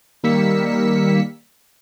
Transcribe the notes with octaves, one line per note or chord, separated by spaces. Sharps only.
D#3 G3 A#3 E6 B6 C#7